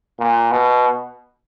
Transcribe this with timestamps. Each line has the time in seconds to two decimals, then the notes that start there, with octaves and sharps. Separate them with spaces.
0.19 A#2
0.52 B2